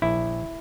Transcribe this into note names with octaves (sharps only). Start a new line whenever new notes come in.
A#1 E4